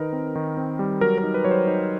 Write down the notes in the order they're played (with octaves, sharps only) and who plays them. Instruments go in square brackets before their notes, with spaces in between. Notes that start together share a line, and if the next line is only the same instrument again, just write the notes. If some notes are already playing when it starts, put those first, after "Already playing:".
Already playing: [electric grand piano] D#3 D#4 A#4 B4
C4
D#3
C4
G3
F#3 A#4
A#4
D#4
B4
F#3 C#5
C5
D#4